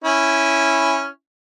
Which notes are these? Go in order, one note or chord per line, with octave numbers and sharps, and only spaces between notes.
C#4 E4